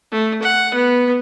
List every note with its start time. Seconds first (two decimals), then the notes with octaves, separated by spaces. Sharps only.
0.12 A3
0.42 F#5
0.74 B3